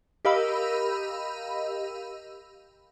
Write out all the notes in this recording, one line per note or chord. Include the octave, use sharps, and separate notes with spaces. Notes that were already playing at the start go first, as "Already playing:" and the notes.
G4 A#4 D#5 F5 B5 E6